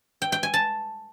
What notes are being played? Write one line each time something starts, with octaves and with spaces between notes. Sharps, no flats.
G5
G5
G#5
A5